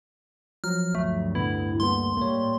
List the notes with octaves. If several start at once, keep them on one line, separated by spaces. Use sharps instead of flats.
F3 F#3 A#5 F6
D2 G2 A3
A2 D3 B3 E4
G3 A#3 B3 C6
A2 G3 A#3 C#5